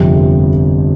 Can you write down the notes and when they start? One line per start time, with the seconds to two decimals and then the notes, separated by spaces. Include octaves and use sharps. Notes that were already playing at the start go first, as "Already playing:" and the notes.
Already playing: G1 F2 C3